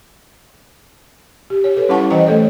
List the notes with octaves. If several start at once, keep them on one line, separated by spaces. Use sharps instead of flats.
G4
C#5
A4 B4
G3 C#4 E4 F#5 A5 C#6
E3 C5 D#5 G5 A#5
A3 A4 C#5